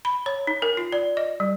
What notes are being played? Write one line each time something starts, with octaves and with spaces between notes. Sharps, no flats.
B5
C#5
D#4
A#4
F4
D5
D#5
G3